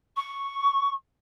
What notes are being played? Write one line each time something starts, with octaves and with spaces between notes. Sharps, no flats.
C#6